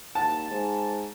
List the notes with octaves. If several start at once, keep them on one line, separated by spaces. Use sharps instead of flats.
D#2 A5
G#2